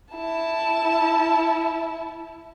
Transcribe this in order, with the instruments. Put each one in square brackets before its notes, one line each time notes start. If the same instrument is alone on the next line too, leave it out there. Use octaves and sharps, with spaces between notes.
[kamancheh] E4 A5